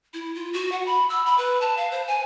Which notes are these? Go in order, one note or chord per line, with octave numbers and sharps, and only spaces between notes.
E4
F4
F#4
F#5
B5
E6
B5
B4
A5
F5
C5
G#5